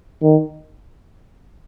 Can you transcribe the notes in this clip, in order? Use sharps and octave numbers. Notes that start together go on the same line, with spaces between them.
D#3